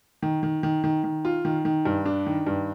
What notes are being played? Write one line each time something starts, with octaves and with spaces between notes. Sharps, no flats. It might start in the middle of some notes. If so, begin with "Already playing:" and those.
D#3
D#3
D#3
D#3
D#3
F4
D#3
D#3
G2
D4
D#3
G2